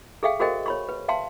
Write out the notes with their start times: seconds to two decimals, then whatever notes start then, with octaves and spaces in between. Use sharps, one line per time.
0.23 G#4 A4 E5 F5 G5
0.40 F#4 G#4 A#4 C5 D#5 G5
0.66 C#5 B5 C#6
0.89 B4
1.08 E5 F5 G5 A5 C6